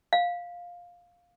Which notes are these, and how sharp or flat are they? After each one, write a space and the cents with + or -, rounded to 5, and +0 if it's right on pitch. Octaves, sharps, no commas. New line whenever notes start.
F5 +10